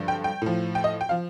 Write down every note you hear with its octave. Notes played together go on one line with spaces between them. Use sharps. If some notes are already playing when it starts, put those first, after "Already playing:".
Already playing: G2 D3 F3
G5
G5
A2 F3
G5
D#5
G5
F3 F5